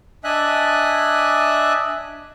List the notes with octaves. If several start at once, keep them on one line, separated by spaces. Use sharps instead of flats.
D4 D#5 E5 G#5 F#6